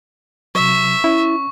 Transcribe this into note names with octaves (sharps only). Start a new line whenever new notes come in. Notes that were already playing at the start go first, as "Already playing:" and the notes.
C3 F#3 E5 C#6
C#4 E4